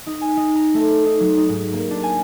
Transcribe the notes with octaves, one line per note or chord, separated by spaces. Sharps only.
D#4
G#5
D#4
A#5
A3
D#4
F#3
D#4
G#2
A#3
D4
G#5